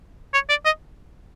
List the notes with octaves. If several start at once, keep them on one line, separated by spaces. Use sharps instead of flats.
C#5
D5
D#5